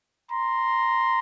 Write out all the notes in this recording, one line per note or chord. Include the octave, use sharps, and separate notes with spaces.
A#5 C6